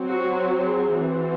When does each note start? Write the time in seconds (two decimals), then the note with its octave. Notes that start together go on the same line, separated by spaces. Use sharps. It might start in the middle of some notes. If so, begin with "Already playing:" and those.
Already playing: F#3 C4
0.09 F#4
0.67 G#4
0.96 E3 C4 F#4